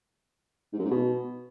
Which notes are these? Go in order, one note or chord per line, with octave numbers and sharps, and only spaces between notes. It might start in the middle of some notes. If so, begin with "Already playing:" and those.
G#2
F#2
G#2
B2